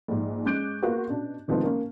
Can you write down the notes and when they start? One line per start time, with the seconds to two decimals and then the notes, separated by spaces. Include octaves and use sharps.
0.08 A#1 G#2
0.45 G#3 C#4 D6 F#6 G6 D7
0.82 A#3 B3 F4 F#4 G#4
1.09 B2 C#4 D4
1.48 C3 D#3 F3 G#3 A3 B3
1.63 A#3 C#4